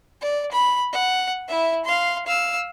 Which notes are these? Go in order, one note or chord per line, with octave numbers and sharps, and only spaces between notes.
D5
B5
F#5
E4 E5
F5 C6
F5 E6